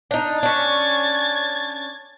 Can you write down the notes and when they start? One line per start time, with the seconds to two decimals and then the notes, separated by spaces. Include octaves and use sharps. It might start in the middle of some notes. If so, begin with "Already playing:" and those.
0.11 D4 D#4
0.43 C#4 D4 G#6 A6